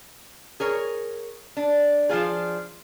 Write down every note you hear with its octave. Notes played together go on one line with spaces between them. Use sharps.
G#4 A#4 C#5
D4
F3 D4 F4 G#4